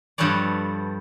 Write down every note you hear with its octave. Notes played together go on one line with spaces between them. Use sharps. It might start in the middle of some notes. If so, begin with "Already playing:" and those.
G2 F3 A4 B4 C#5 D5